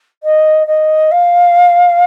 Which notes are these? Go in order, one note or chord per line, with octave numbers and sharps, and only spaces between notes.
D#5
D#5
F5